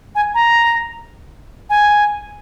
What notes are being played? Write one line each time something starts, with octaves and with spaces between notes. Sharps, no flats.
G#5
A#5
G#5